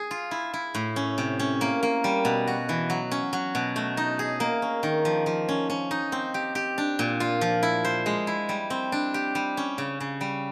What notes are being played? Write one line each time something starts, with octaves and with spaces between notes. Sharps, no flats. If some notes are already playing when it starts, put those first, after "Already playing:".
Already playing: G#4
F4
E4
E4
A2
C#4
C3
C#4
A#3
A#3
G3
B2
F#4
E3
F#3
C#4
F#3
B2
A3
D#4
G#4
A#3
C#4
D#3
F3
F3
C#4
C#4
D#4
C4
G4
G4
D4
A#2
F4
F3
E4
C5
G#3
E4
G3
C4
D4
G4
G3
C#4
C#3
C#3
G3